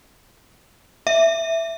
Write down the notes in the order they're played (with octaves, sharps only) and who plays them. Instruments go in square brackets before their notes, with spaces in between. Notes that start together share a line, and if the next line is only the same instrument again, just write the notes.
[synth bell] E5